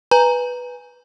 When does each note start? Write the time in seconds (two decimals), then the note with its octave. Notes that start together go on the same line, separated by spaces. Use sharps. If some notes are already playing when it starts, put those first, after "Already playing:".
0.11 B4 G#5 A#5